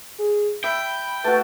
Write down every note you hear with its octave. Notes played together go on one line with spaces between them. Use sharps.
G#4
E5 G5 B5
A3 F#4 B4 A6